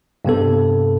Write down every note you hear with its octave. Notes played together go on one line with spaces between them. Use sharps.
G2 C3 B3 A4